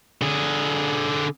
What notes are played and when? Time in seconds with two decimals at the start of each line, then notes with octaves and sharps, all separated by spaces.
0.22 D3 G#4